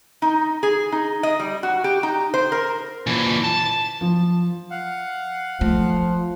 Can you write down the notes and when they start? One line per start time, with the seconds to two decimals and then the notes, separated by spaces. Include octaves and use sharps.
0.22 D#4
0.63 G#4
0.92 D#4
1.23 D#5
1.40 G3
1.63 F#4
1.84 G4
2.03 D#4
2.34 C5
2.52 A#4
3.07 A#2 E3
3.44 A5
4.01 F3
4.71 F5 F#5
5.61 F3 A3